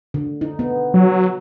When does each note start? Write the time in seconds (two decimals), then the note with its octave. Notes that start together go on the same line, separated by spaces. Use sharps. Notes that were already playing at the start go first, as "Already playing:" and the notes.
0.14 D3
0.41 D#4
0.59 B3
0.94 F#3